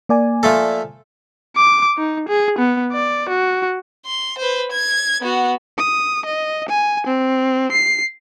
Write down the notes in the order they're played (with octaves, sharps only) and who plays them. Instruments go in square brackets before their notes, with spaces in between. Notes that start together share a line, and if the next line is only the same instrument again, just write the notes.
[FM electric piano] A#3 D5 G#5
[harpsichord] F3 A3 A4
[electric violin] D6
D#4
G#4
B3
D5
F#4
[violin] C6
B4 C5
G#6
B3 F#4
[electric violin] D#6
D#5
G#5
C4
C7